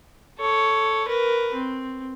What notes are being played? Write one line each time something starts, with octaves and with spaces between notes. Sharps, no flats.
A4 C#5
A#4 B4
C4